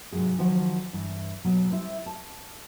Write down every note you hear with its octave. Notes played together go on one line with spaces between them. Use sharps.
G#2 C3 F#3 F4 G#4
D#3 F3 F#3 C5 F#5
G2 E3
B2 F#3 A#3
G3 E4 C5
A5